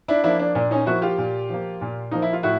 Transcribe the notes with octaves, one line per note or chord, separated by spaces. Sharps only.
D4 E4
F3 A#3 D4 E4
D4
A#2 D4
C#4 D#4
F3 A#3 E4 F#4
F4 G4
A#2
F3 A#3
A#2
F3 A#3 D#4
E4
F4
A2 E4 F#4